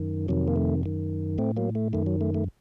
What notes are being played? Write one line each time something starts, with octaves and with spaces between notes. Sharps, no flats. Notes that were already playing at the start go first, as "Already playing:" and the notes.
Already playing: F#2 D#3
F2 C3 D#3 F#3
A#3
A3
F#2 D#3
A2 A3 C4
F#3 A#3
A3
F#2 D#3 A3
F#3
A3
A3